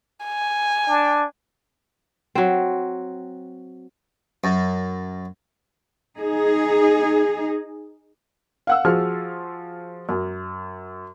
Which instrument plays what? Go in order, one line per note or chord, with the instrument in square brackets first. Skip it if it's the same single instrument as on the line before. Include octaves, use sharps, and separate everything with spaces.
[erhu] G#5
[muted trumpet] D4
[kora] F#3 C4
[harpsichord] F#2
[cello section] D#4 G#4
[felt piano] F5 F#5 E6
F3 F4 F#4 G#4 F6
F#2